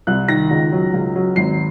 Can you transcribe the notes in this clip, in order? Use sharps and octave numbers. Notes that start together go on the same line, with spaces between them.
C2 F#6
D#3 A#6
C#2
F#3
C#2
F#3
G#1 C7